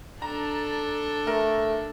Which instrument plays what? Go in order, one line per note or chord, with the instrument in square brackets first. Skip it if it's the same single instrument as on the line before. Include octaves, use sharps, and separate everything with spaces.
[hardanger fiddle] D4 A4 [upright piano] A#5
[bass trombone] A3 [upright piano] A#4